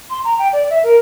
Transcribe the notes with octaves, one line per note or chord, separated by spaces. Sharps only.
C6
A#5
G5
D5
E5
A#4